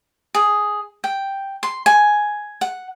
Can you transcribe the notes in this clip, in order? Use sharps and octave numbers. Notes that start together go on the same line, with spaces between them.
G#4
G5
C6
G#5
F#5